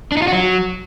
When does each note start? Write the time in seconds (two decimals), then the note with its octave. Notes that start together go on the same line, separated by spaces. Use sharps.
0.12 D4
0.17 D#4
0.22 F4
0.27 F#4
0.33 F#3